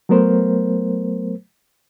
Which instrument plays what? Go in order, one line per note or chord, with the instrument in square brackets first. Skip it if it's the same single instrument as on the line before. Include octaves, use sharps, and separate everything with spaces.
[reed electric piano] F#3 A3 B3 A#4 C5